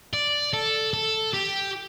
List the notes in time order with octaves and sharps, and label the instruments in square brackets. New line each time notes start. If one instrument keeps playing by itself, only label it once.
[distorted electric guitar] D5
A4
A4
G4